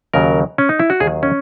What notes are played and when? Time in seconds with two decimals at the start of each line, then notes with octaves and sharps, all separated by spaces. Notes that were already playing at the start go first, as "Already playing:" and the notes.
0.14 D#2 C#3 F#3 A#4
0.58 C#4
0.69 D#4
0.79 E4
0.90 F#4
1.00 D#2 D#3 F#3 G#4
1.23 C#4